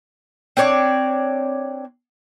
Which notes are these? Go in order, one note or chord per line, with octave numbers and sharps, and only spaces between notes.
C4 D4 C#5 D5